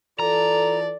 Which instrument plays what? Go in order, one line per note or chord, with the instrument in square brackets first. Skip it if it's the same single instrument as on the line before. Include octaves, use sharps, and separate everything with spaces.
[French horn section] E3 F4 A4 [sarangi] D5 [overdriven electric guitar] A#5